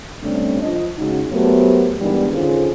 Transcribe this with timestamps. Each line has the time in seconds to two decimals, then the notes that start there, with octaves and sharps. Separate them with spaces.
0.23 C3 G3 A3 C#4 D4
0.62 F3 D#5
0.98 C#3 G#3 D#4 F#4
1.32 F#3 A3 B3 G4 A#4 C5
2.00 D#3 E3 G3 G#3 B3 D4
2.32 D3 D#3 C#4 F4 G#4 C5